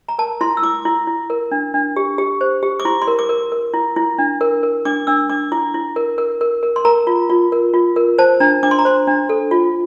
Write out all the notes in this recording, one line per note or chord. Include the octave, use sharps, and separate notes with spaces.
A#5
A#4 A5
E4 C6
E6
E4 D6
E4
E4
A#4
D4
D4
G4
G4
C5
G4
D6
E4 C6
C6
A#4
D6
A#4
A#4
E4
E4
D4
A#4
A#4
D4 D6
D4 E6
D4 D6
E4 D6
E4
A#4
A#4
A#4
A#4
C6
A#4 A#5
F4
F4
A#4
F4
A#4
C5 A5
D4 A#5
D4 D6
C6
A#5
C5 C6
D4
A4
F4